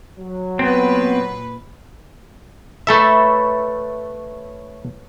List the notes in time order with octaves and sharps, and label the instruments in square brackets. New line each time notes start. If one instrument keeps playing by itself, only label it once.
[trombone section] F#3
[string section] A#2 B4 [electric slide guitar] B3 C4
[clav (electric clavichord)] A3 A4 E5 [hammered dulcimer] B4 C#5 B5